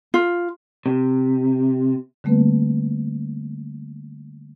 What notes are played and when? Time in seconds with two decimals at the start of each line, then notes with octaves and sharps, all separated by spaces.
0.14 F4
0.86 C3
2.24 D3 G3 A3 A#3 C4 B4